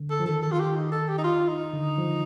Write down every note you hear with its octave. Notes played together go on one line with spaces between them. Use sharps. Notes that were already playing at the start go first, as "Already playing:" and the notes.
Already playing: D3
A4
F3
D#3 A4
A4
F4
G4
D#4
A4
G4
D#4
F4
D#4
D3
F3